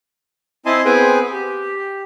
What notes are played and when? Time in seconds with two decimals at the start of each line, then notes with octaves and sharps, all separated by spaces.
0.66 C4 E4 D#5 G#5 A5 C6
0.85 B3 C4 G#4 B4 G5 G#5
1.32 G4